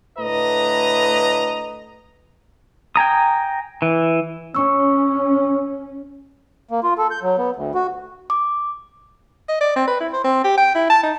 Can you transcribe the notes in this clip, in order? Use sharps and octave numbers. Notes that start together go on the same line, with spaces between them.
A2 D3 B4 D#5 A#5
G5 G#5 A#5 D#6
E3
C#4 C#6 E6
A#3
F4
A4
G6
F#3
B3
D2
F#4
D6
D#5
D5
C4
B4
E4
C5
C4
G4
G5
E4
A5
D#4